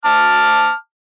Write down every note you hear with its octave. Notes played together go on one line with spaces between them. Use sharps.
A5 D6 F6